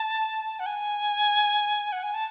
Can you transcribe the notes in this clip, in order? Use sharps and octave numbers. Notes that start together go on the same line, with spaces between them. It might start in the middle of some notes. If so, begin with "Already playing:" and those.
Already playing: A5
F#5
G#5
F#5
G#5
A5